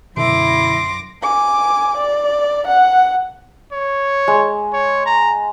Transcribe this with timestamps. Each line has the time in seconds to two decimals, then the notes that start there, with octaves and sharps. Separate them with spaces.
0.17 F#2 B2 D3 E4 C6 D6 A#6
1.22 G#5 D6
1.97 D5
2.68 F#5
3.72 C#5
4.28 G#3
4.73 C#5
5.06 A#5